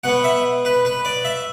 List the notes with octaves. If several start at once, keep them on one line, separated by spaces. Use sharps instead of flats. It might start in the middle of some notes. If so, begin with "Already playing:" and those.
B2 B3 F#5
E5
B4
B4
D5
E5